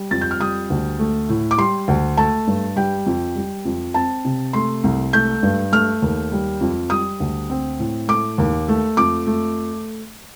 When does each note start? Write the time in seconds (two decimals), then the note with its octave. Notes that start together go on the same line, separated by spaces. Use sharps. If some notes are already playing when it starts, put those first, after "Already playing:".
Already playing: G3
0.11 F2 A6
0.21 G6
0.31 F6
0.40 G3 D#6
0.70 D2
0.99 A3
1.29 A2
1.51 D6
1.58 G3 C6
1.88 D2
2.17 A3 A5
2.47 G2
2.76 G3 G5
3.06 F2
3.36 G3
3.65 F2
3.94 C4 A5
4.25 C3
4.53 A3 C6
4.84 C2
5.13 A3 G6
5.43 G2
5.72 A3 F6
6.02 D#2
6.32 G3
6.61 F2
6.90 G3 D#6
7.20 D2
7.50 C4
7.79 A2
8.08 A3 D6
8.38 D#2
8.68 A3
8.97 F2 D6
9.27 A3